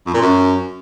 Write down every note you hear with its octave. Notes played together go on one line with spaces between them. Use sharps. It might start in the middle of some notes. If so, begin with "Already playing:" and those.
F2
A#2
F#2